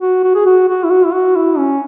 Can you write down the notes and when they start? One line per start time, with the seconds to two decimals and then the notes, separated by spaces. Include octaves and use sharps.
0.01 F#4
0.24 F#4
0.35 G#4
0.46 F#4
0.69 F#4
0.84 E4
0.91 F#4
1.05 E4
1.13 F#4
1.36 E4
1.58 C#4